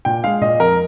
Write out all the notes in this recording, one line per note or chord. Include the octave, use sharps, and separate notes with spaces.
A#2 G5
G#3 F5
A#2 D#5
F2 A#4